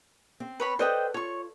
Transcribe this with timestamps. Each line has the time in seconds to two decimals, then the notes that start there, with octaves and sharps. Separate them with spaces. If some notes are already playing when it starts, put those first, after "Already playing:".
0.40 C4
0.60 B4 C#5 B5
0.79 A4 B4 C5 D5 D#5 G5
1.14 F4 C#5 C#6